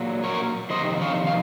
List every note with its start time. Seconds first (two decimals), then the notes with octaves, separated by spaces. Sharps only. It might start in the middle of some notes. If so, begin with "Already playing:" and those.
Already playing: A#2 F#3
0.24 A#4 C#5
0.70 F2 C3 D#3 C5 D#5
1.01 C#5 F5
1.27 F5